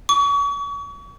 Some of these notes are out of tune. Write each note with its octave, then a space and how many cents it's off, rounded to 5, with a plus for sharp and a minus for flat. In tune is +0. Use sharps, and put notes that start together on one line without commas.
C#6 +40